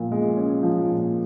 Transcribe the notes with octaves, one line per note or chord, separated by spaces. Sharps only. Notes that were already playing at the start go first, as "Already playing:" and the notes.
Already playing: A#2 F3
G#3
C#4
F3
A#2